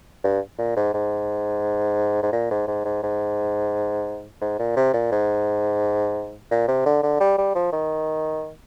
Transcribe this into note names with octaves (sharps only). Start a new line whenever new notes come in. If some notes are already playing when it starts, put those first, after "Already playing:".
G2
A#2
G#2
G#2
G#2
A#2
G#2
G#2
G#2
G#2
G#2
A#2
C3
A#2
G#2
A#2
C3
D3
D3
G3
G3
F3
D#3